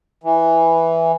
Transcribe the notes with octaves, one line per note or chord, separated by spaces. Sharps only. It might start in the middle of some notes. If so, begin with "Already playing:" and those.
E3